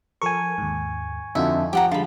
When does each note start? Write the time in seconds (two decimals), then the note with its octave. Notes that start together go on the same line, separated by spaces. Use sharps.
0.22 F3 A4 A#4 G#5 C#6
0.58 D#2 G#2
1.35 F2 D3 D#4 F4 F#4 E5
1.73 F3 G4 F#5 A#5
1.92 D3 G3 G#3 F4 B5